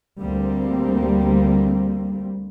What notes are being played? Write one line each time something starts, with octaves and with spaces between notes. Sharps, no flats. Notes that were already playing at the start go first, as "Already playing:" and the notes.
D2 G3 A#3 C4